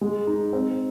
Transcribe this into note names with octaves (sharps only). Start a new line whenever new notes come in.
G#3
D#4
C4